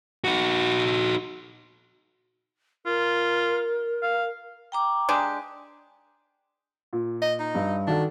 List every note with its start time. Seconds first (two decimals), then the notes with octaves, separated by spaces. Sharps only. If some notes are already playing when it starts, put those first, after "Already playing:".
0.24 D#4 F#4
2.86 F4 A#4
4.03 F5
4.72 G5 A#5 D6
5.09 G#3 D4 G4
6.93 A#2
7.22 D#5
7.40 D#4
7.55 G2
7.87 D#3 D4 F#4 A4